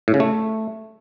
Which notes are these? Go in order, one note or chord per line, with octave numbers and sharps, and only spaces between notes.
A2
C#3
A3